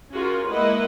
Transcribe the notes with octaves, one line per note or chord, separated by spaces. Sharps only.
C#4 F4 F#4 G#4 A#4
G#3 A#3 E4 B4 D#5 F#5